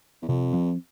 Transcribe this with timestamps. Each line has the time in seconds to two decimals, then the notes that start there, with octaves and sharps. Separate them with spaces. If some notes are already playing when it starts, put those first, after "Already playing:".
0.23 E2
0.28 F2 C3
0.53 F3 C4